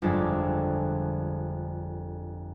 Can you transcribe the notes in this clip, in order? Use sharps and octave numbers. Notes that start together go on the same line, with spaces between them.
G1 F2 G#3 D4 A4 C#5